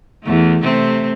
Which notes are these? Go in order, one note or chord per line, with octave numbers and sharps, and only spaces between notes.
E2 A3
C3 A3 C4